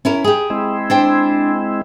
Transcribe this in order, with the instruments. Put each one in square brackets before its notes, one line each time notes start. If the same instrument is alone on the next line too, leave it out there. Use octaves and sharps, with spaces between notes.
[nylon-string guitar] C#4 E4 A#4
G4 G#4
[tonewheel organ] G#3 C4 E4
[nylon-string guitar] D4 C5 G5